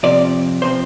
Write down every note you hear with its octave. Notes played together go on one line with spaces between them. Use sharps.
C3 F3 C4 D5
C3 F3 C4 C5